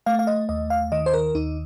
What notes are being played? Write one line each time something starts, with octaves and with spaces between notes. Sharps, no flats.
A3 F5
F5
D#5
D#2 D#5
F5
D#3 D#5
C5
A#4
D#2 D#4